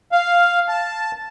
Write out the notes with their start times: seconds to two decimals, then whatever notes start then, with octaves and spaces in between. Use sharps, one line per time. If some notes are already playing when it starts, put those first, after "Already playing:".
0.12 F5
0.69 A5